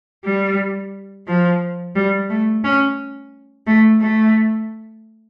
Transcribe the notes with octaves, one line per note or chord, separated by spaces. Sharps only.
G3
F3
G3
A3
C#4
A3
A3